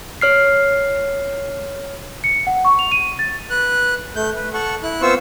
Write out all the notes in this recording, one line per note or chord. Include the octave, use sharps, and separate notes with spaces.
C#5 F6 C7
C#7
F#5
C#6
F7
D#7
A6
B4 F#6
A3 G6
B4
A4 F#5 C#6
E4 F#6
B3 C4 F4 C5 C#6 E6